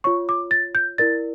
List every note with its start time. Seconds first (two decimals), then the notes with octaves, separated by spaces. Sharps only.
0.04 F4 C#5 C#6
0.29 D6
0.51 A6
0.75 G6
0.98 E4 A#4 D5 A6